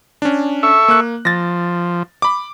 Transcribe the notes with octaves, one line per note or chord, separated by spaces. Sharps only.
C#4 D4
A4 E5 C#6
A#3 F#6
F3 A6 A#6
B5 D6